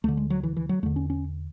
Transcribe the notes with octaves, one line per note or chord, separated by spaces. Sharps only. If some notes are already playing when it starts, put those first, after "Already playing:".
D2 D3 A3
G#3
F#3
E3
E3
F#3
E2 D3 A3
C#4
C#4